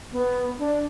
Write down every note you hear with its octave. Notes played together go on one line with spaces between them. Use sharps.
B3
D4